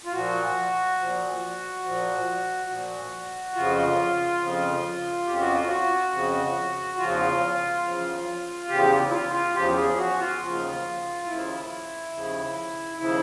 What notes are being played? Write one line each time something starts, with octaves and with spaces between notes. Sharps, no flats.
F4
A#2 F3 F#4
A#2 F3
A#2 F3
A#2 F3
F2 C#3 F3 F4
F2 C#3 F3
F2 C#3 F3 G4
F#4
F4
F#4
F2 C#3 F3
E2 C#3 F3 F4
E2 C#3 F3
E2 C#3 F3 G4
E4
F4
F4
E2 C#3 F3 G4
G4
G#4
F#4
F4
D#2 C#3 F3
D#2 C#3 F3 E4
D#2 C#3 F3
D#2 C#3 F3 E4